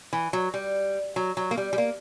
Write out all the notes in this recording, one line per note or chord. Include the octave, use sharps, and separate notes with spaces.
E3
F#3
G3
F#3
F#3
A#3
G3
G3
A#3